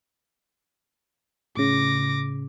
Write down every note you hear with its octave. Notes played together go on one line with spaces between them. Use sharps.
A2 C#3 D6 A#6